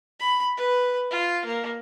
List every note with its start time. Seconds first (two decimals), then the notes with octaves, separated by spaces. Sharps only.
0.20 B5
0.57 B4
1.11 F4
1.45 A#3